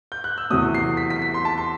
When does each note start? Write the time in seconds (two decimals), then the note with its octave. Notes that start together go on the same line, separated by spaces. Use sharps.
0.12 G6
0.24 F#6
0.38 E6
0.50 E2 C3 F#3 A3 D#6
0.75 C7
0.97 B6
1.10 B6
1.22 B6
1.34 C6
1.45 A5
1.58 C6